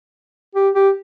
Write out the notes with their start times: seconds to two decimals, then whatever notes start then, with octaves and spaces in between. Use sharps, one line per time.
0.55 G4
0.75 G4